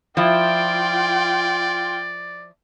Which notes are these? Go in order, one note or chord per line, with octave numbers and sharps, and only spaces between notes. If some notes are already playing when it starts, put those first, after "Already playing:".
F3 E4 F4 D5 G5